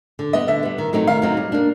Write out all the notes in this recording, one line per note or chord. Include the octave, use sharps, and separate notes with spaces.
D3
G3 B3 D#5
D3 E5
G3 B3
D#3
F#3 A3 C4 D#4
D#3 F5
F#3 A3 C4 D#4
G3
A#3 D4